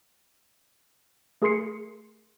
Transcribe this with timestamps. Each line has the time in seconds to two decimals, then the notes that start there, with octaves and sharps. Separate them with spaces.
1.42 A3 G#4 A#4 C6 C7 C#7